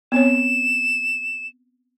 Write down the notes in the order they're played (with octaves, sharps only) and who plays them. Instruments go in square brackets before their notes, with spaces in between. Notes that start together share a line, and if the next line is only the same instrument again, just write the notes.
[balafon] B3 C4 C#5 [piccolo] E7